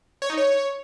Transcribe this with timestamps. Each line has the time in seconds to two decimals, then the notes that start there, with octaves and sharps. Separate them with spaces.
0.22 C#5
0.30 D#4
0.38 C#5